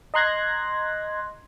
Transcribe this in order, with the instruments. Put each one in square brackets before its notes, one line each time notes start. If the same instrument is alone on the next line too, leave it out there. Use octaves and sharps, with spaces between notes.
[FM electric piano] D#5 A#5 C6 F#6 G#6 A#6